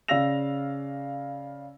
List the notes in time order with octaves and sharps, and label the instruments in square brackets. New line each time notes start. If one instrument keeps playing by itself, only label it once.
[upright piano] C#3 D5 F5 E6 A#6 F7